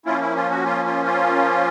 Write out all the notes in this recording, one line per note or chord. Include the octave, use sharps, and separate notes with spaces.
F3 A#3 C#4 E4 F4
E4
F4
F#4
F4
F4
F4